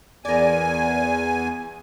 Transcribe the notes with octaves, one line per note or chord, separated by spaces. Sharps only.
E2 A#4 D5 G#5